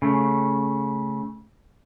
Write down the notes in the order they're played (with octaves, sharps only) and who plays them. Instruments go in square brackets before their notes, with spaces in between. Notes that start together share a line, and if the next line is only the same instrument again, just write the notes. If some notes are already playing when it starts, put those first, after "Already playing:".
[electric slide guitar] C#3 A3